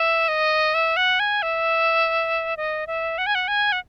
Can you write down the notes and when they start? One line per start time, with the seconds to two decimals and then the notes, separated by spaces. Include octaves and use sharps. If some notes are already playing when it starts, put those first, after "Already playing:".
Already playing: E5
0.28 D#5
0.74 E5
0.97 F#5
1.20 G#5
1.42 E5
2.57 D#5
2.87 E5
3.18 F#5
3.26 G#5
3.35 F#5
3.48 G#5
3.72 F#5